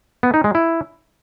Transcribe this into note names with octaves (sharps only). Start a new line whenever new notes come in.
B3
D#4
G#3
E4